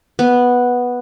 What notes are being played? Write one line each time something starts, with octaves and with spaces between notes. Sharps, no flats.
B3